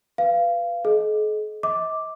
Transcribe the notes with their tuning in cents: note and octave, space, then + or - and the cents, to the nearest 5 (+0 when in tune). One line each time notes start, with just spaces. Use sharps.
B4 +0 F5 -20
G#4 +45 D#5 +0
D#5 +40 D6 +0